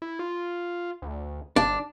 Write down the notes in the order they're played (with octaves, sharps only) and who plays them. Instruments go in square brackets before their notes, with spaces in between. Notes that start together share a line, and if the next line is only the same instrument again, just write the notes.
[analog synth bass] E4
F4
D2
[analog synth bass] G1 [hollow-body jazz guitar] D4